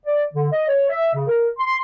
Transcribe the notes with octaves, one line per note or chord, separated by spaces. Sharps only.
D5
D3
D#5
C#5
E5
C#3
A#4
C6